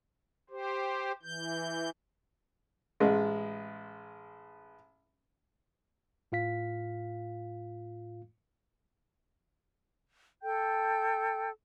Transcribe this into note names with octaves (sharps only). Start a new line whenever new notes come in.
G4 C5
E3 G6
A1 G#3
A2 F4 F5 B6
A4 G5 G6